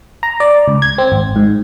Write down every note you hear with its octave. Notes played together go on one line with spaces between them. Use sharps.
A#5
D5
C#2
G#6
C4
G#1
G#2